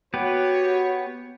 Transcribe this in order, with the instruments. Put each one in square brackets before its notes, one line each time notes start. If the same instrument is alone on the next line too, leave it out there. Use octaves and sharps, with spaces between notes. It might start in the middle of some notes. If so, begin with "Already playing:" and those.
[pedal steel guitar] B3 G4 B4 [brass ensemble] F#4 C#5